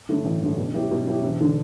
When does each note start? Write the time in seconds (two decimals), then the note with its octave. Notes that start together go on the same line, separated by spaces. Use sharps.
0.09 G2 D3 F#3 A3
0.25 A1
0.42 G2 D3 F#3 A3
0.57 B2
0.74 F#3 B3 E4 G4
0.91 B2
1.07 F#3 B3 E4 G4
1.24 E1
1.41 D3